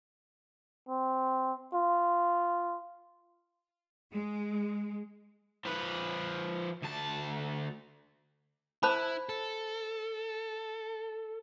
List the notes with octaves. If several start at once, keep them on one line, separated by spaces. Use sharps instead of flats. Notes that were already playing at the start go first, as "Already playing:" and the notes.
C4
F4
G#3
F3 B4
D2 A5
E4 C5 A5 B5
A4